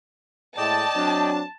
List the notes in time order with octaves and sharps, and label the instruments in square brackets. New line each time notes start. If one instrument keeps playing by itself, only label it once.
[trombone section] A2 G#3 [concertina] D5 D#5 G5 [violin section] A5
[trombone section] F#3 C4 D4